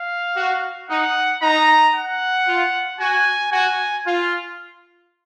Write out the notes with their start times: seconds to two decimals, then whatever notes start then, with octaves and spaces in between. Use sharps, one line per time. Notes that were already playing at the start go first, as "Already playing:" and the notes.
Already playing: F5
0.37 F#4
0.89 D#4 F#5
1.42 D#4 A#5
1.95 F#5
2.47 F4
3.00 F#4 G#5
3.52 F#4 G#5
4.05 F4